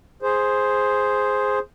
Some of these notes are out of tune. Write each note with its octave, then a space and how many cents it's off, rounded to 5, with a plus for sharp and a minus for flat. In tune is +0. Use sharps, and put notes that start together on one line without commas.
G#4 +0 C5 +0